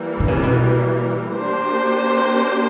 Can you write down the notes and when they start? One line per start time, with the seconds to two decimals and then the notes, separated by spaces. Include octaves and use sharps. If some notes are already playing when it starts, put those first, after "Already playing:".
Already playing: E3 G3 A#3
0.20 D3
0.28 C#3
0.35 C3
0.43 B2
1.35 A#3 D4 G4 C5